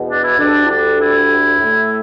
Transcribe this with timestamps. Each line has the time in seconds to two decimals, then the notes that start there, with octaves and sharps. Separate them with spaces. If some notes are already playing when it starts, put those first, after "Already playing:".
Already playing: E2 B2
0.09 D4
0.24 E4
0.38 D2 D3 G3 D4
0.64 E4
0.69 D4
0.99 E4
1.59 A2 A3